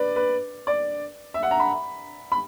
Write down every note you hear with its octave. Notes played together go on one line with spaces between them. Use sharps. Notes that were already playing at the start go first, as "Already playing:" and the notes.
Already playing: B4 D5
B4
D5
E5
F#5
A#5
B5
B5